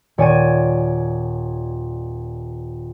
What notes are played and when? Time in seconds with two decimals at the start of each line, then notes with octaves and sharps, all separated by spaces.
0.18 D#1 C#5 D5 G#5 C#6 D#7